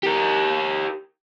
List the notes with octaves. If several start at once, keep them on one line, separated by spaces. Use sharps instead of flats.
G4 A#4